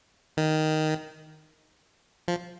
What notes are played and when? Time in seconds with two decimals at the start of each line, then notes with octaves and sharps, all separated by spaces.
0.37 D#3
2.28 F3